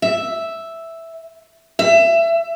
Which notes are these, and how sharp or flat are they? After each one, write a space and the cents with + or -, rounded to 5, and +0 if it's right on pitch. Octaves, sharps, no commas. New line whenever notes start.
E5 +0
E5 +20